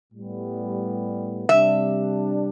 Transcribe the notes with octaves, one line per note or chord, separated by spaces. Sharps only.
A2 G3 B3
C3 G3 D4 E5